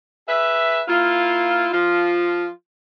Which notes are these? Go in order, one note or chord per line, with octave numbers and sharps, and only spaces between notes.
G#4 B4 E5
A#3 E4 F4
F3 F4